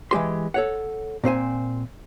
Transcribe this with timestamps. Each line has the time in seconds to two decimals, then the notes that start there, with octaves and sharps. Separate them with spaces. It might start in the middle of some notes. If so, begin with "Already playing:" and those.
0.11 E3 G#3 G4 C6
0.54 A4 C#5 F#5
1.24 A#2 C4 C5 G#5